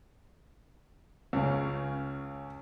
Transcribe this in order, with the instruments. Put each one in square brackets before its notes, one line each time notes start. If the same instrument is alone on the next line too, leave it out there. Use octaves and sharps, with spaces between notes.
[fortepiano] C#2 C#3 [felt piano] C#4